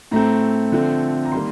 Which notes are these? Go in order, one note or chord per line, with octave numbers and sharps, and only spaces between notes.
A2 A3 C4 A#5
D3 F3 A3 C4
A#5
D#3 G3 A#3 C6